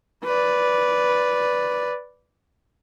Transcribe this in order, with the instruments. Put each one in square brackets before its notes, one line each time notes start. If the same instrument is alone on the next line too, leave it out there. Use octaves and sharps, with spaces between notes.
[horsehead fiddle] B4 D5